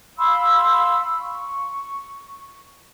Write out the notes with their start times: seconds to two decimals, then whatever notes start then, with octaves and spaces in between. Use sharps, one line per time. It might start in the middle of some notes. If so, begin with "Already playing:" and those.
0.18 F5 B5 C6 E6
1.20 C#6